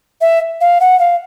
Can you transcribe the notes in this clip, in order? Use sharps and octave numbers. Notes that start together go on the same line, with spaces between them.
E5
F5
F#5
F5